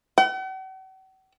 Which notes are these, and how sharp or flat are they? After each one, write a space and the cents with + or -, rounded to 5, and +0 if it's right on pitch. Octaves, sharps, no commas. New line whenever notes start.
F#5 +45